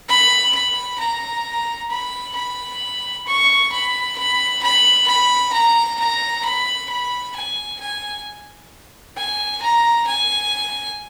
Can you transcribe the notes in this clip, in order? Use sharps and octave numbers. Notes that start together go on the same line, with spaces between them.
B5
B5
A#5
B5
B5
C#6
B5
B5
B5
B5
A#5
A#5
B5
B5
G#5
G#5
G#5
A#5
G#5